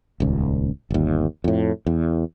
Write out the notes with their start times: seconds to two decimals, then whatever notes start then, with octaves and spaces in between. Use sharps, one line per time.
0.20 D#1 C#2
0.90 G1 D#2
1.44 F2 A2
1.86 E2